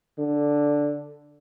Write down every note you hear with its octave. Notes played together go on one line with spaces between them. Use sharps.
D3